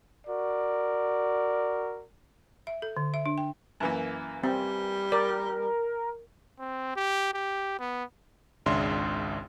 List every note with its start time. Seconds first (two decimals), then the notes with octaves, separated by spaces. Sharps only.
0.27 F#4 A#4 D5
2.67 E5
2.82 A4
2.97 D3
3.14 E5
3.26 D4
3.38 G5
3.80 F#2 E3 A#3
4.43 G3 C4
5.12 A#4 D5
6.59 C4
6.96 G4
7.34 G4
7.80 B3
8.66 G#1 C#2 C#3 D4 E5 C6